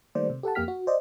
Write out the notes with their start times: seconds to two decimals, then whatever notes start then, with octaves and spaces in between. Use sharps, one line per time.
0.15 D#3 G3 A3 A#3 C5 D5
0.30 C3
0.43 G4 A4 F#5 A5
0.55 F2 A#3 G4 F6 B6
0.68 F#4
0.87 C5 D5 D#5